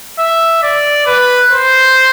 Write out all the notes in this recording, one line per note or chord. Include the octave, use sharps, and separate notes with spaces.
E5
D5
B4
C5